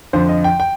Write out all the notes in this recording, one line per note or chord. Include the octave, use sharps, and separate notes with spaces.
F2 D3 F3 C5
D#5
G5
G5